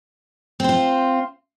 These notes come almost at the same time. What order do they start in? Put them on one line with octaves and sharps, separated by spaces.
C4 C5 F4